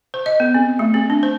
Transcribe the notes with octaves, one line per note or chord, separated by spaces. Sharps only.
C5
D#5
B3
C4
A3
C4
D4
C5